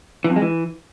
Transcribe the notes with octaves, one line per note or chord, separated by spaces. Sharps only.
E3
F2
G#3
E3